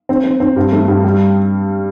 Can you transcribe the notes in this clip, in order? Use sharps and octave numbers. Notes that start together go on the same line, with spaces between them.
C4
C4
C4
G2
A3
G2
G3